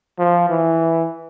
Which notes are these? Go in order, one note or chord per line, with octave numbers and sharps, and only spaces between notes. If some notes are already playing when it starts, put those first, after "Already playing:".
F3
E3